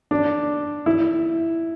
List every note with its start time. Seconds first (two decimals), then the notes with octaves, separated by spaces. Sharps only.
0.11 D4
0.86 E4